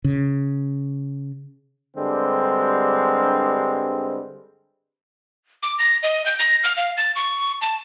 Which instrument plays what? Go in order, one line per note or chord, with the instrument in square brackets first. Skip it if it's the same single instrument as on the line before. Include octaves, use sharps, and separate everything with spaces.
[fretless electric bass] C#3
[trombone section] G2 D3 G3 G#3 C4
[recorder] D6
A#6
D#5
G6
A#6
F6
F5
A6
C#6
A5